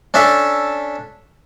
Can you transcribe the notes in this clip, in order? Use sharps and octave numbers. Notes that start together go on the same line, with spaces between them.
C#4 D4 A4 E5